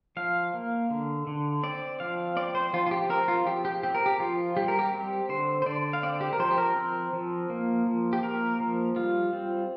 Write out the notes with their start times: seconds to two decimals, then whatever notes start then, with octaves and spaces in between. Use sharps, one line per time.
0.17 F3 F5
0.54 A#3
0.90 D3
1.27 D3
1.63 C4 D5
2.00 F3 F5
2.36 C4 D5
2.55 C5
2.73 F3 F4
2.86 F4
2.91 G4
3.10 C4 A#4
3.28 F4
3.46 F3 G4
3.65 G4
3.83 C4 G4
3.95 A#4
4.06 G4
4.20 F3 F4
4.57 G3 G4
4.68 A#4
4.79 G4
4.93 C4
5.29 D3 C5
5.62 C5
5.66 D3 D5
5.93 F5
6.03 C4 D5
6.21 G4
6.33 A#4
6.39 F3 C5
6.51 G4
6.58 A#4
6.76 C4
7.13 F3
7.50 A#3
7.87 F3
8.13 G4
8.23 A#3 A#4
8.60 F3
8.96 G3 F4
9.32 C4